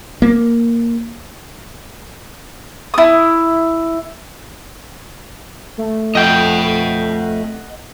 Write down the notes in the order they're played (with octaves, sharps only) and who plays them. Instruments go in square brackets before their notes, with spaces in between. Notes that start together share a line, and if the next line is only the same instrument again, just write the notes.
[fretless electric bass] A#3
[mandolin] E4 D#6
[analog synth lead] A3
[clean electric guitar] F2 G5 [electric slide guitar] D#5 F#5